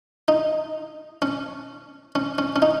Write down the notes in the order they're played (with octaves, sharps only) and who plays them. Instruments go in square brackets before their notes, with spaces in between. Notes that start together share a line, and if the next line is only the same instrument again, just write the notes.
[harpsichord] D#4
C#4
C#4
C#4
C#4
D#4